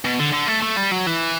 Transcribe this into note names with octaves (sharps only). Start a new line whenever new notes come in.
B2
D3
D3
A3
A3
G3
F#3
E3